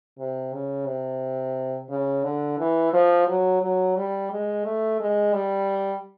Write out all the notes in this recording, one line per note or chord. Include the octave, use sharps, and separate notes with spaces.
C3
C#3
C3
C#3
D3
E3
F3
F#3
F#3
G3
G#3
A3
G#3
G3